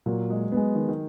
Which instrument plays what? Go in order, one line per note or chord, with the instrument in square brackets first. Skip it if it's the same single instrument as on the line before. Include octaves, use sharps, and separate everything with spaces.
[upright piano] A#2 [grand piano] F#3
[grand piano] G#3
[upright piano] G#3 B3
[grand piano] D#3
D#3